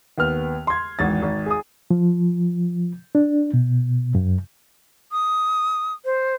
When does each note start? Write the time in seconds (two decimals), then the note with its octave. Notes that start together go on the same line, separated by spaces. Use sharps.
0.18 D#2 B3 F6
0.67 C6 G#6
0.99 G#1 E2 A6
1.23 G#1
1.46 G#4 D#6
1.91 F3
3.15 D4
3.54 B2
4.15 F#2
5.12 D#6
6.05 C5